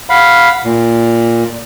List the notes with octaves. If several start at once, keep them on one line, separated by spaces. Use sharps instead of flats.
F5 F#5 B5
A#2